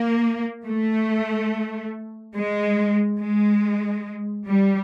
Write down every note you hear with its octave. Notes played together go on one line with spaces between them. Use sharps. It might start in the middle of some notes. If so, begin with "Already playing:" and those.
Already playing: A#3
A3
G#3
G#3
G3